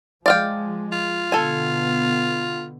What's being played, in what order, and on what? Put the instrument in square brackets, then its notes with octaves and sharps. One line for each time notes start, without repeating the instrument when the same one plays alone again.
[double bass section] F3 G#3 [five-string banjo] D5 F5 G5
[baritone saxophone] F4
[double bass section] B2 D3 B3 [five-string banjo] A4 G#5